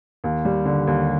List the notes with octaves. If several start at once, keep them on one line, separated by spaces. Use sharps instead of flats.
D#2
G3
D3
D#2